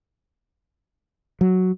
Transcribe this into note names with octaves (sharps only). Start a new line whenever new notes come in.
F#3